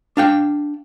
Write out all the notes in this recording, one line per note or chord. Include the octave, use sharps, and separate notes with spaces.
D4 F5 G5